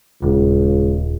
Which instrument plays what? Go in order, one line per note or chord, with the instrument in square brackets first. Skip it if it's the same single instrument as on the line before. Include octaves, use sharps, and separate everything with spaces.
[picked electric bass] D#1 [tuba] C#2